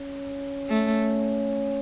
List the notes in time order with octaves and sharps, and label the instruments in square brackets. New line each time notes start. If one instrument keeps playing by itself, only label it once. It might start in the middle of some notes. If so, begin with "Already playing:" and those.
Already playing: [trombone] C#4
[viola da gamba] A3